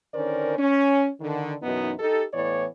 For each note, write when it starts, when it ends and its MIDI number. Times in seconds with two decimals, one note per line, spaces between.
0.14 0.55 50
0.14 0.55 51
0.14 0.55 61
0.14 0.55 70
0.14 0.55 72
0.14 0.55 74
0.58 1.09 61
1.21 1.53 50
1.21 1.53 51
1.63 1.92 42
1.63 1.92 47
1.63 1.92 52
1.63 1.92 59
1.63 1.92 63
1.99 2.24 63
1.99 2.24 67
1.99 2.24 69
2.34 2.64 45
2.34 2.64 52
2.34 2.64 59
2.34 2.64 73
2.34 2.64 74